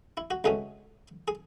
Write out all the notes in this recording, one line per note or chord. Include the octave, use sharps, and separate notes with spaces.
E4
F#4
C#2 B2 F#3 A3 C#4 G#4
G#4